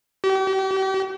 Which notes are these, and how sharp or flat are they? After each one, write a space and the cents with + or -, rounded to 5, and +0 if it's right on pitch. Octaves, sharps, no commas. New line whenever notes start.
G4 -40